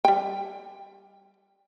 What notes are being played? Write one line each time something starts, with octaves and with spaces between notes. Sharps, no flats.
G3 G5